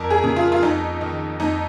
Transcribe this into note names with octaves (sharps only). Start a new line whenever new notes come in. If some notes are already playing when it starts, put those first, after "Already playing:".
Already playing: F2 A#4
G#4
C#3
F4
F4
F2 D#4
D#3
F2 D#4